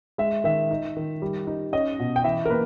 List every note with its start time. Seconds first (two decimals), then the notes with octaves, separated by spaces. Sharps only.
0.18 G#3 E5
0.44 D#3 E5
0.71 D#4
0.97 D#3
1.22 G3
1.47 D#4
1.73 C#4 D#5
1.99 B2
2.16 G5
2.24 E3 E5
2.46 A#4
2.50 A#3 B4